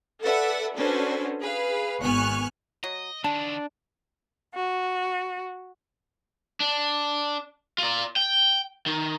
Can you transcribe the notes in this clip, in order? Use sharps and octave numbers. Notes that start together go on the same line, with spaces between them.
A4 B4 D5 E5 F#5
C#4 D4 F#4 A4 B4 C5
G#4 B4 F5
G#1 B3 G#5 C#6 F6 F#6
F#3 D#5
D3 D#3 D4 A5
F#4
D4
F4 D5
G5
D#3